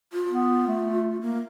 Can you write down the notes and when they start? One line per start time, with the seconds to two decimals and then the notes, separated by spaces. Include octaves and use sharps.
0.13 F4
0.30 B3
0.68 A3
1.21 A#3